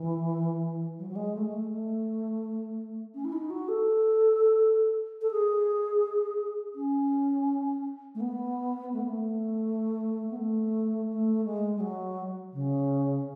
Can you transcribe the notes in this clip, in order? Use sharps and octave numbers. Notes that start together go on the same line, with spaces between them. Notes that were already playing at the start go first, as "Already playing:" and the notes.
Already playing: E3
F#3
F#3
G#3
A3
G#3
A3
A3
C#4
E4
D#4
F#4
A4
A4
G#4
C#4
A3
B3
A3
B3
A3
B3
A3
A3
G#3
G#3
F#3
C#3